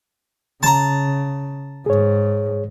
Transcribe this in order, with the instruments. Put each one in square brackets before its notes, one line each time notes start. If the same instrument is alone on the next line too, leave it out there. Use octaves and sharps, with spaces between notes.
[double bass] C#3 [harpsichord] A5 A#5
[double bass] G#2 [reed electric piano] G#4 C#5